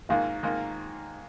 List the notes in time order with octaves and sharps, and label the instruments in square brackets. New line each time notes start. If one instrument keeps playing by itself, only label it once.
[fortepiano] G#2 D#3 A#3 F4 [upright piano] F5
[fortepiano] G#2 D#3 A#3 F4